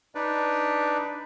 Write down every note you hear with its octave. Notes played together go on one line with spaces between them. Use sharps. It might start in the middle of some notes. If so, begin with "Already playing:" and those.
D4 D#4 B4 D5